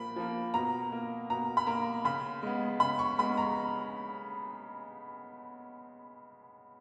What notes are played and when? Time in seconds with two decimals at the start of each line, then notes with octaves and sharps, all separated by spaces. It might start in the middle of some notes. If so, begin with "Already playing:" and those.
Already playing: A#2 F3 A#3 B5
0.16 F3 A#3
0.54 B2 A#5
0.92 A#3
1.30 B2 A#5
1.57 B5
1.67 A#3 A#5
2.05 C#3 B5
2.43 G#3 B3
2.80 C#3 B5
2.99 C#6
3.19 G#3 B3 B5
3.37 A#5